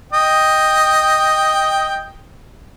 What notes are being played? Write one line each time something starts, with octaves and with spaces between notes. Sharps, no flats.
D#5 G5